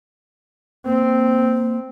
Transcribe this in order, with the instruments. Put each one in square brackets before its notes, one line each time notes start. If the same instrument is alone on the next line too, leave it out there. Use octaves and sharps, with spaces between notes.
[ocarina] A#3 [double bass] C4